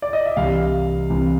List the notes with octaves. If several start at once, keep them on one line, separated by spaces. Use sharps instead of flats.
D5
D#5
E5
C2 C3 E3 F5
C2 C3 E3